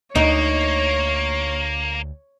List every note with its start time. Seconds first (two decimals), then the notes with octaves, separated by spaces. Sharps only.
0.15 D2 A#3 D#4 C#5